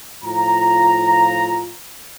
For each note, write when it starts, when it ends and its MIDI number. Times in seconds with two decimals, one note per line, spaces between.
0.24 1.72 45
0.24 1.72 53
0.24 1.72 65
0.24 1.72 82